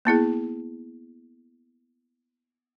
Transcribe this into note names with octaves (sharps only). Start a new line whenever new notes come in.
A#3 B3 E4 G#4